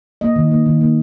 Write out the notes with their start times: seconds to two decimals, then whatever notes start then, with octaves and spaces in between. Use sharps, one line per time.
0.21 A#3 D#5
0.36 D#3
0.51 A#3
0.66 D#3
0.81 A#3